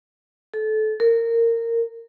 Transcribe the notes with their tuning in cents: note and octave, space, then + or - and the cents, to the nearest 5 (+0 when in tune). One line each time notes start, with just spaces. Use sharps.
A4 -25
A#4 -20